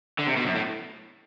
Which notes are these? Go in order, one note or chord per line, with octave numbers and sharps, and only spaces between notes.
D3
C3
B2
F#2
A2